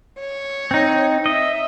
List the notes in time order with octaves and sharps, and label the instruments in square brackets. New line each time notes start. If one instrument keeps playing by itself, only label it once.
[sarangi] C#5
[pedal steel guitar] C4 D#4
[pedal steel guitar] D#5 [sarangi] E5